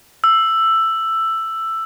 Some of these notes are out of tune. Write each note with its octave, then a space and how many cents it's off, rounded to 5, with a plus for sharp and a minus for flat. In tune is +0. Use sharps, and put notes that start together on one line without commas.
E6 +10